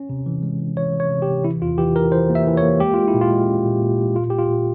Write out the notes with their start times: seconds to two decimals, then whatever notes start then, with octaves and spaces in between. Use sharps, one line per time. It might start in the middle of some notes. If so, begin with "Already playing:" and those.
Already playing: C#4
0.09 C3
0.26 E3
0.43 G#3
0.60 E3
0.77 E3 C#5
0.93 E3
1.00 C#5
1.10 C3
1.22 G4
1.28 C3
1.44 E3 E4
1.62 E2 F4
1.78 E3 G4
1.95 E3 A#4
2.12 E3 C5
2.30 A#3
2.35 E5
2.47 E3
2.57 C#5
2.63 A#3
2.80 G#3 G4
2.94 G#3 F4
3.08 E4
3.14 A#2
3.21 F4
3.30 G#3
3.48 C#4
3.65 A#2
3.82 A#2
3.99 A#2
4.15 A#2 F4
4.30 G#3 G4
4.38 F4
4.49 A#2